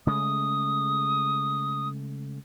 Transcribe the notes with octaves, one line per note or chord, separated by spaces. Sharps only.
C#3 G#3 A3 D#6